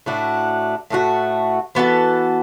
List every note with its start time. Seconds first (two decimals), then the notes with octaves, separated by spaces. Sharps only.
0.06 A2 A3 D4 F#4
0.90 A2 A3 D4 F#4
1.75 E3 B3 F#4 A4